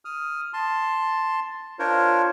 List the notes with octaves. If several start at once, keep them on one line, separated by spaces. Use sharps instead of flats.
D#6 F6
A5 C6
D4 F4 A#4 C5 C#5